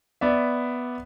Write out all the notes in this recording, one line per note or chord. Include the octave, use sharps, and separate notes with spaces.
B3 D5 E5